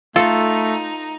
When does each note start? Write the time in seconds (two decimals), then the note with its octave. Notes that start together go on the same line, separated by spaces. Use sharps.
0.16 A3 D#4 F4 A4